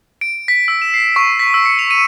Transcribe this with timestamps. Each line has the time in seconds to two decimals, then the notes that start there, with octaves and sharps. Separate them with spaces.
0.21 D7
0.48 B6
0.68 E6
0.82 E7
0.94 C7
1.16 C#6
1.39 B6
1.54 E6
1.66 C#7
1.79 F7
1.90 D#7